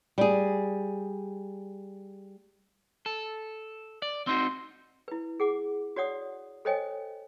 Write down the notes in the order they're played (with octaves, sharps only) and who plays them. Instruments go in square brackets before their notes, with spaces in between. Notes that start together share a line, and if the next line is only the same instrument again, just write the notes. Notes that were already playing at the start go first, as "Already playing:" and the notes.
[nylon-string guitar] G3 G#4
[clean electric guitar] A4
D5
[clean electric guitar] C4 D#4 F#4 [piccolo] C6
[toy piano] E4 B4
G#4 F#5 D6
F#4 C#5 D5 F#5 D#6
A4 C5 C#5 D#5 G5 G#5